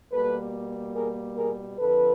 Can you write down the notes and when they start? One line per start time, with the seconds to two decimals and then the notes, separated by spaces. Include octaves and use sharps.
0.11 B2 G3 A#3 A4 B4
0.95 G#4 A#4
1.37 G#4 A#4
1.78 F2 D3 F3 A4 B4